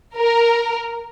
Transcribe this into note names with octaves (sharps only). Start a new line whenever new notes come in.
A#4